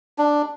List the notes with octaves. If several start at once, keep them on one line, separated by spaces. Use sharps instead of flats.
D4